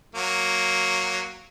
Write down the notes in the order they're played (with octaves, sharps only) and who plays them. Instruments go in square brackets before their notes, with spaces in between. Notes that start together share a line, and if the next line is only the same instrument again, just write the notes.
[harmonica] F#3 A#3